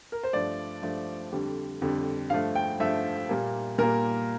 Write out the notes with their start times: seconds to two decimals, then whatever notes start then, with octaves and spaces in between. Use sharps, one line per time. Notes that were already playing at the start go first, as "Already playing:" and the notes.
0.12 A#4
0.23 C5
0.33 G2 F3 A3 D5
0.83 G2 F3 A3
1.32 F2 D3 G3
1.82 F2 D3 G3
2.30 G2 F3 A3 F5
2.55 G5
2.80 G2 F3 A3 E5
3.29 A#2 G3 A#3
3.78 A#2 G3 A#3 A#4